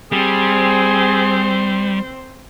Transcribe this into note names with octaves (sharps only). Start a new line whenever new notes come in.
G3 C4 G#4 C5